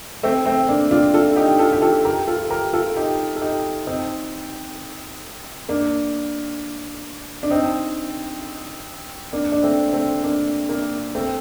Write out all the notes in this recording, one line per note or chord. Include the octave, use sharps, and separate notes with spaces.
A3 C4
A3 C4
A#3 D4
D4 F4
F4 A4
D#4 G4
F4 A4
G4
F4 A4
G4 A#4
F4 A4
G4 A#4
F4 A4
D#4 G4
A4
D#4 G4
C4 D#4
A#3 D4
D4
C4 D#4
A#3 D4
D4
A3 C4
A3 C4
A#3 D4
A#3 D4
A3 C4